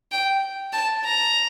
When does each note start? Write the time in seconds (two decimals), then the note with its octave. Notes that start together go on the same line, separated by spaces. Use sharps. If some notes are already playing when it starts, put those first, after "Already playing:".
0.12 G5
0.73 A5
1.04 A#5